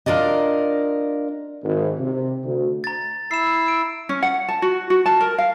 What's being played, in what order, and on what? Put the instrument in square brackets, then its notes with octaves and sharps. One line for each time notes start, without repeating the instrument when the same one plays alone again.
[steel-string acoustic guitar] D4 F4 A#4 D5 D#5
[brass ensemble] G#1
C3
D2
[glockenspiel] A#5 A6
[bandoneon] E4 E6 [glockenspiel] C7 E7
[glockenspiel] D7
[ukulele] C#4
F#5
A5
F#4
F#4
A5
A#4
F5